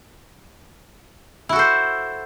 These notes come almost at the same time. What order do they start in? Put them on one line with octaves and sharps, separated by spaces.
E4 F#4 A4 C5